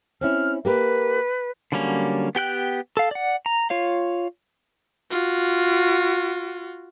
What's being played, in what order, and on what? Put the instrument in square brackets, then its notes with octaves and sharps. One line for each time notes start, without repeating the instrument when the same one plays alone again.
[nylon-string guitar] C4 C#4 E4 [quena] F6
[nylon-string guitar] A#3 G4 A#4 [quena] B4
[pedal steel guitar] D3 F#3 G3 A#3 C#4
B3 G4 G5 F#6
A4 F5
D5 F#5
A#5
F4 C#5 F5
[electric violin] F4 F#4